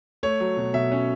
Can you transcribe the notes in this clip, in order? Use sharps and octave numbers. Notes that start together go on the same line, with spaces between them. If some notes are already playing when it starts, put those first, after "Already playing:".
A3 C#5
F#3
B2
B2 E5
C#4